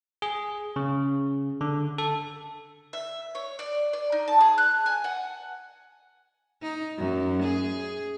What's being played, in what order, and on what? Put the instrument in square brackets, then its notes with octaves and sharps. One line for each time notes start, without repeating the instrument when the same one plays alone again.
[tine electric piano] G#4
C#3
D3
A4
[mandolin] E5
C#5
D5
D5
D#4
A5
G#4
F#6
G#5
F#5
[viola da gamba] D#4
F#2
G#4